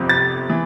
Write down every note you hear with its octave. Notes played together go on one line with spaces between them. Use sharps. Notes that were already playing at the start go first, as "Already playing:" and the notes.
Already playing: G1 F2 C3 F3 C4
A6
E3